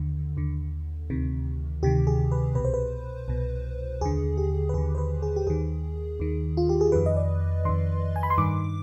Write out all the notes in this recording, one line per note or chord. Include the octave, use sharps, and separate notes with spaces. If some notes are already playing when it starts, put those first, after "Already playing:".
Already playing: D#2 D3
D#2 D3
D2 C3 D#3
D2 C3 D#3 G4
G#4
B4
C2 B2 B4
C5
B4
C2 B2
D#2 D3 G#4
G4
B4
D#2 D3 G#4
C5
B4
G#4
G4
D#2 D#3 G#4
D#2 D#3
F4
G4
G#4
F2 D#3 B4
D#5
D5
F2 D#3 C6
G#5
B5
C6
G2 D#3 D6